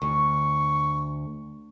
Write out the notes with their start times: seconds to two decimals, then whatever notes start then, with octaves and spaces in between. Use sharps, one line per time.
0.02 D2 C#6